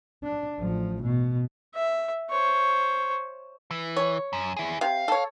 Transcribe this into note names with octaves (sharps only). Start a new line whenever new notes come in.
D4
A1 F3
B2
E5
C5 C#5
E3
C#5
F#2
E4 G#4
C3 F5
A4 C#5